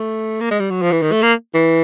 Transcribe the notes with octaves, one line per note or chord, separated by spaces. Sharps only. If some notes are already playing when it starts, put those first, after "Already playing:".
Already playing: A3
A#3
G#3
G3
F#3
F3
E3
D#3
A3
A#3
E3